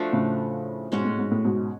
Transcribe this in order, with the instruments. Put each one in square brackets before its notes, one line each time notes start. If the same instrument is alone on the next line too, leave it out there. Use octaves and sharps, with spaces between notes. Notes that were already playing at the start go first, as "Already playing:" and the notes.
Already playing: [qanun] F3 A3 D4 F#4
[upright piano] A2 C#3
[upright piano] G#2 B2 [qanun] G#3 C#4 F#4
[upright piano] A2
G#2
A2
G#2 B2